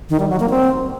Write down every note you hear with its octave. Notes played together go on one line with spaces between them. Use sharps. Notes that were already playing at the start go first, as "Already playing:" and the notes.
D#3
G3
F#3
A#3
C4